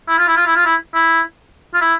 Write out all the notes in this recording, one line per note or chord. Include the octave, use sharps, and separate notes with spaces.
E4
F4
E4
F4
E4
F4
E4
E4
F4
E4